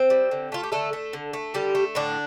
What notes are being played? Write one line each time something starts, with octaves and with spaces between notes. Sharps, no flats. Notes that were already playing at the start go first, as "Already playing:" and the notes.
Already playing: C4 C5
G3
D3
A3 F4
G4
D3 A3 A4
A3
D3
A3
D3 G3 G4
A3
A2 D3 D4